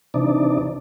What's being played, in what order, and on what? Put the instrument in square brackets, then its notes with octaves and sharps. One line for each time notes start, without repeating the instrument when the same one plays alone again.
[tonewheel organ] C3 E3 D4 D#4 D5